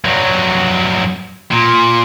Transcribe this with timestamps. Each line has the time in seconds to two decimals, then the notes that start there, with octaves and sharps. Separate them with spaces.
0.05 G2 F#3
1.51 A#2